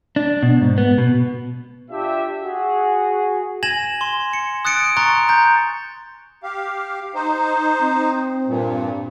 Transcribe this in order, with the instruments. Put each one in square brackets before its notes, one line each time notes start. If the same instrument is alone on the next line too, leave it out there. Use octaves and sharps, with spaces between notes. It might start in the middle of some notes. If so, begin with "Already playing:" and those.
[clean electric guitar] D4
B2
G#2
B3
B2
[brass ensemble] D4 F4 G4 E5
F#4 G#4
[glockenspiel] G#5 G#6 A#6 E7 F#7
C6
C#7
D#6 F#6 A6 C#7 D7
A#5 C6 C#6 F#6 A6
A#5 G6
[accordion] G4 F5
D#4 C5
[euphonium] C4
[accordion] G2 A#2